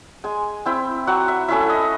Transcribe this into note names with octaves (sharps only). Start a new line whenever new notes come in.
G#3 G#5
C4 E4 G5
F#3 F#5
E5
A3 C#4 E4 E5
D#5